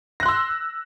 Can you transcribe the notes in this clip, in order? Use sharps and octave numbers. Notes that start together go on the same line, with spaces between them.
C6 E6 F#6 A#6